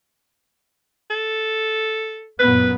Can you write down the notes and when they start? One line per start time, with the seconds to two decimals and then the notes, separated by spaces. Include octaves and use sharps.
1.10 A4
2.39 F#2 A#2 B3 B4